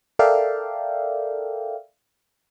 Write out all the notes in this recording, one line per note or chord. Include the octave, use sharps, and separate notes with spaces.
A4 A#4 D5 E5 F5 G5